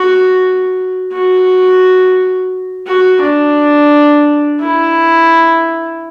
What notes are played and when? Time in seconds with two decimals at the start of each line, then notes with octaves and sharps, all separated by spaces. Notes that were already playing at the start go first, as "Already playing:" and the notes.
Already playing: F#4
1.13 F#4
2.87 F#4
3.22 D4
4.60 E4